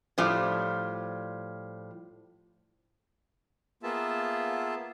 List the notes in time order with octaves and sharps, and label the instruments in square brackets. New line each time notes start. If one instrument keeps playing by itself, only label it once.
[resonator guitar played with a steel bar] A2 F3 G3
[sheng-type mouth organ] A#3 B3 F4 G#4 E5 A5